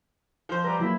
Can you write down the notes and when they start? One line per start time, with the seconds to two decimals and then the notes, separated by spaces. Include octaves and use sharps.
0.49 F3 C5
0.64 G3 G4 B4 A#5
0.80 F#3 A#3 E4